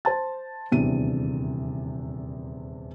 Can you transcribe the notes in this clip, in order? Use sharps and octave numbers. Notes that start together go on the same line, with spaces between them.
C5 A5 A6
D#1 E2 C3 D4 D#7